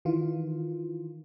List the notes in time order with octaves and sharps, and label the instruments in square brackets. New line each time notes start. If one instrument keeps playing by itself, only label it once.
[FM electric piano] D#3 E3 F4